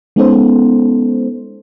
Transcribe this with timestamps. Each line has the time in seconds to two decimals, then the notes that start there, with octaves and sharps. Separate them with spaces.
0.16 G#3 B3 C#4 D#4 A4 C5